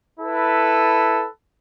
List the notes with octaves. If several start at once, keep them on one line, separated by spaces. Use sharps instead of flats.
E4 A4 B4